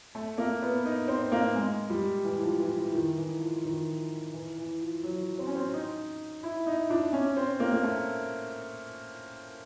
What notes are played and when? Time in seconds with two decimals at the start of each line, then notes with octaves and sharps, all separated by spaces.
0.15 A3
0.38 A#3
0.62 B3
0.85 D#4
1.08 C4
1.32 A#3
1.55 G#3
1.90 G3
2.24 E3
2.42 F3
2.60 E3
2.77 E3
2.94 D#3
3.18 E3
3.41 F3
3.65 D#3
4.33 E3
4.58 E3
4.81 F3
5.03 F#3
5.39 C4
5.47 C#4
5.55 C4
5.74 D#4
6.43 E4
6.66 D#4
6.90 D4
7.13 C#4
7.37 C4
7.60 A#3
7.73 A#3
7.83 A3